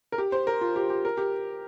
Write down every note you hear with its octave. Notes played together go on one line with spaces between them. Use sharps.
A#4
G4
C5
A#4
F4
G4
G4
A#4
G4